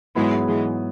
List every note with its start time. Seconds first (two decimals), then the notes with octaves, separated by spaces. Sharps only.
0.15 G#2 E3 F#3 G#3 B3 E4
0.48 E3 G#3